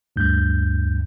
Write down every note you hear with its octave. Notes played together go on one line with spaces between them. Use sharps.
D2 G2 G6